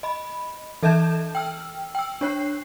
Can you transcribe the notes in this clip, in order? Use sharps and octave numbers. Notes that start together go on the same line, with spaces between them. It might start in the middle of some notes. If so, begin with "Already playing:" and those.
D#5 B5
E3 A4 E5 A5 G6 E7
G5 E6 F6
G5 E6
D4 C#5 F#6 C7